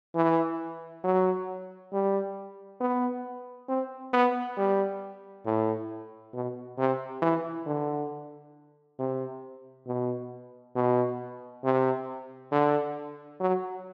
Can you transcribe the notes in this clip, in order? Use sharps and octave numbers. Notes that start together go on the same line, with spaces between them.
E3
F#3
G3
B3
C4
B3
G3
A2
B2
C3
E3
D3
C3
B2
B2
C3
D3
F#3